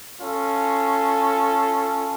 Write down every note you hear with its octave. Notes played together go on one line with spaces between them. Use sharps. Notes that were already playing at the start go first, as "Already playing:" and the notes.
C#4 F4 A4